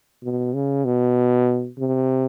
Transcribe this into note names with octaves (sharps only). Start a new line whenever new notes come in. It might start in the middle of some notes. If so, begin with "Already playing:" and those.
B2
C#3
B2
C3